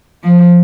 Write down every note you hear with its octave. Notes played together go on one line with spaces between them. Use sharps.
F3